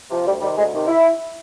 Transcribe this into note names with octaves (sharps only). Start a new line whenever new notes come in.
C3 F3
D2 G3
C3 D#3 G3
D2 G#3
C3 D#3
E4